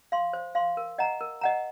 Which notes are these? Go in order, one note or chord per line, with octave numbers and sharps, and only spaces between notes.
F5 C6
C5
F5 C6
A#4
D#5 F#5 A#5
A#4
D#5 F#5 A#5